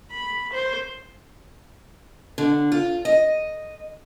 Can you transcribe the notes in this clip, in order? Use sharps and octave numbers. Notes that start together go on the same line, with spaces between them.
B5
C5
D3
F4
D#5